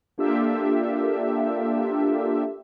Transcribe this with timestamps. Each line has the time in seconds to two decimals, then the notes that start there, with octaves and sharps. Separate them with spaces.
0.18 A#3 D4 F4 G4 A4 E5